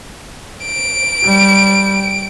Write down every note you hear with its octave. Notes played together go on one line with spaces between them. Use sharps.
D7
G3